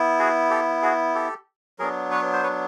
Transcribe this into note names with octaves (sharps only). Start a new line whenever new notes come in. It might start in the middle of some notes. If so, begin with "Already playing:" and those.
Already playing: B3 E4
F#4 G#4
G4 A4
F#4 G#4
G4 A4
F#3 B3 D4 G#4 A#4
B4 C#5
C5
B4 C#5